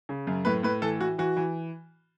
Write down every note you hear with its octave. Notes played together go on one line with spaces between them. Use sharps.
C#3
F#2
A2 B4
A2 B4
E3 A4
E3 F#4
E3 F#4
E3